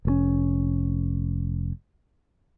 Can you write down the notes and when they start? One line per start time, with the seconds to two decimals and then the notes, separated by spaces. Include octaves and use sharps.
0.05 F1 A2 C#4